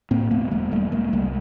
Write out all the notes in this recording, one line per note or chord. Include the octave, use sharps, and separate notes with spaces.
A2 A#3 C4
E1 A3 B3
E1 G#3 A#3
E1 G3 A3
E1 G#3 A#3
C2 G3 A3